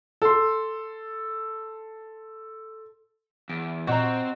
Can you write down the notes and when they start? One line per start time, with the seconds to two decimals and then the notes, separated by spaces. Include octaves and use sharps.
0.22 A4 C6
3.49 E2 D7
3.87 A#2 C4 F#4 C5 D#5 A#5